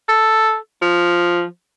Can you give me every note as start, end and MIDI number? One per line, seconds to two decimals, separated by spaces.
0.08 0.55 69
0.82 1.44 53